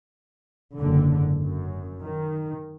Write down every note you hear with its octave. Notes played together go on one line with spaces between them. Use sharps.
F#1 G#2 D3
F#2
D#3